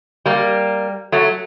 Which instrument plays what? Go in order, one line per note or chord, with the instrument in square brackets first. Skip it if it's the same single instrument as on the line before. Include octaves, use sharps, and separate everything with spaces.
[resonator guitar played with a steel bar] G3 A#3
F#3 A3